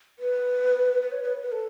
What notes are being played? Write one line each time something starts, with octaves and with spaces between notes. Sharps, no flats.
B4
B4
C#5
B4
B4
A4